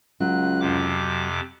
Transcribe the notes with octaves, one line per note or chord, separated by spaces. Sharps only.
C#2 F#3 F#6
F2 C3 D6